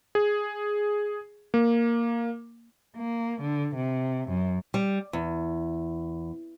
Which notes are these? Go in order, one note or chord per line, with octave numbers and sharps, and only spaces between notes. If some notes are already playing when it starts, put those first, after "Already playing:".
G#4
A#3
A#3
D3
C3
F#2
G3
E2